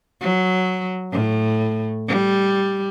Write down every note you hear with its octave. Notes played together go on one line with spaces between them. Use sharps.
F#3
A2
G3